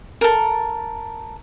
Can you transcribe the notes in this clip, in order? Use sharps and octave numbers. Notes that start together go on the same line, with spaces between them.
A4 A#4